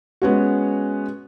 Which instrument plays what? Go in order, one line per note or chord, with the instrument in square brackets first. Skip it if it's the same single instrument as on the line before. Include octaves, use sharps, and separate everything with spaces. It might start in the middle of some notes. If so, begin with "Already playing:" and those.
[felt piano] G#3 B3 C#4 F#4